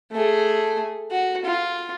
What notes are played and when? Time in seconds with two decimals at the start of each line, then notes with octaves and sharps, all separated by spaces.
0.12 A3 G#4
1.11 F#4
1.45 F4